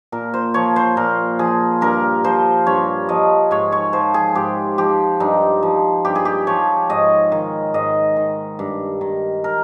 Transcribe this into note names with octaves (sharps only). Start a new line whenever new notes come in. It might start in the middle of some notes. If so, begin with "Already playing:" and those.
A#2 A#4
C5
F3 C#5
C5
A#2 A#4
F3 G#4
G2 A#4
F3 C5
G2 C#5
F3 D#5
G#2 C#5
C#5
F3 C5
G#4
G#2 G4
F3 G4
G2 D#4
F3
G2 G4
G#4
G4
F3 C#5
G#2 D#5
D#3
G#2 D#5
D#3
G2
D#3
A#4